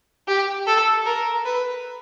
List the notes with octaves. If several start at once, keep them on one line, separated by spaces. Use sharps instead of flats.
G4
A4
A#4
B4